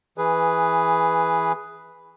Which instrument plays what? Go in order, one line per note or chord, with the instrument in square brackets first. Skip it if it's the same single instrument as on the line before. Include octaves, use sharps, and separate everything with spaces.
[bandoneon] E3 G#4 B4